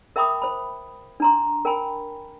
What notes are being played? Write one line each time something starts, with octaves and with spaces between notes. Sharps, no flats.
A#4 E5 G5 B5 D6 D#6
C5 B5
D4 A#5 C6
A#4 G5 G#5 B5